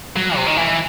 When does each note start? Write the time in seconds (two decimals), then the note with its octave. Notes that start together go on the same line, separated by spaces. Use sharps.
0.16 F#3
0.36 C3
0.47 D#3
0.57 E3